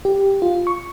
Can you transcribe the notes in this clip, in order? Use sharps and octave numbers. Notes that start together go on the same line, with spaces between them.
G4
F4
C#6